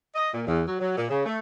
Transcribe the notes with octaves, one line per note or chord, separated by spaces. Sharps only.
D#5
A#2
E2
F#3
F#3
A#2
C#3
A3